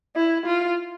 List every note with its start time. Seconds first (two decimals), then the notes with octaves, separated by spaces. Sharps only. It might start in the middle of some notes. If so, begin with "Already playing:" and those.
0.16 E4
0.46 F4